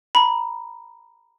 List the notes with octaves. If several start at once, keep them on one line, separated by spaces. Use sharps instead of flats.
A#5 B5